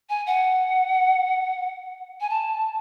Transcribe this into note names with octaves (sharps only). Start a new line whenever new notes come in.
G#5
F#5
G#5
A5